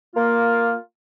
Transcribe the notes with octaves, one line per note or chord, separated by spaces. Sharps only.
A#3 F4